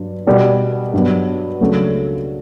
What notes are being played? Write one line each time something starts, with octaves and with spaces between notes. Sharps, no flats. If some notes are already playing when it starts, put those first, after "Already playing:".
Already playing: G2 F#3
B2 G3 B3
G2 F#3 B3
C#2 C#3 F#3 A3 D4